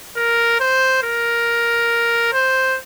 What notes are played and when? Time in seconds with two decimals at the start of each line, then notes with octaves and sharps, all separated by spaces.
0.16 A#4
0.60 C5
1.03 A#4
2.33 C5